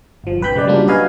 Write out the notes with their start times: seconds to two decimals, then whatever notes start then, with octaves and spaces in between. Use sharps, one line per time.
0.24 G1 F3
0.41 B1 F#2 B4 G5 B5 G6
0.54 C#3 G#3 D5
0.67 F#3 G3 A#3 C#4 D4 F4
0.87 F#4 B4 D#5 F5 G#5